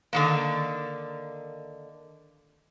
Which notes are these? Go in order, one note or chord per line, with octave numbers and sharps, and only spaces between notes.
D3 D#3 A#3